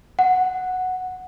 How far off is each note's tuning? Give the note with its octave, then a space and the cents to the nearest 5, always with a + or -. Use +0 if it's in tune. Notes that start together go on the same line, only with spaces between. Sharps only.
F#5 -5